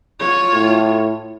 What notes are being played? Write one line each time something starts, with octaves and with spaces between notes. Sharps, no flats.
F4 C#5
A2